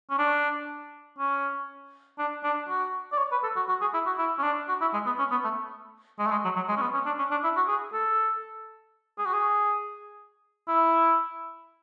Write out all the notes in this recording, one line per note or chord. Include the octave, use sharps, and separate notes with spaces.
C#4
D4
C#4
D4
D4
F#4
D5
C#5
B4
A4
F#4
F#4
G#4
E4
F#4
E4
C#4
D4
F#4
E4
G#3
B3
C#4
B3
A3
G#3
A3
G#3
F#3
F#3
G#3
C#4
B3
C#4
D4
C#4
D4
E4
F#4
G#4
A4
G#4
F#4
G#4
E4